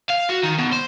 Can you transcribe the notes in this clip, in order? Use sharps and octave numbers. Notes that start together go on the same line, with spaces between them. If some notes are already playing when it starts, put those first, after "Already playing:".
F5
F#4
D#3
B2
C5